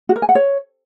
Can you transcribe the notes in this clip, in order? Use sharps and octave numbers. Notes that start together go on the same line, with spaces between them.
F#4
A#4
G#5
F#5
C#5